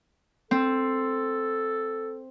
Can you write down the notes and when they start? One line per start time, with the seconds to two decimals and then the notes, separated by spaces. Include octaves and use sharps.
0.51 C4 A4